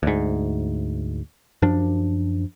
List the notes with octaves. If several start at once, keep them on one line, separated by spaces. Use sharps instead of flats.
D2 G#2
F#2 F3 D4